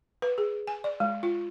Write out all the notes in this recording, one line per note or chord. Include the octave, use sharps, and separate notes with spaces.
B4
G#4
G#5
D5
G#3
F4